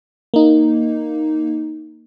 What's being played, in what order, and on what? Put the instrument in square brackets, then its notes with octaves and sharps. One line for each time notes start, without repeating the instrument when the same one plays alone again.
[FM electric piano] A#3 D#4